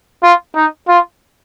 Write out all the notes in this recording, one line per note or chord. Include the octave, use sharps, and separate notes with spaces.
F4
D#4
F4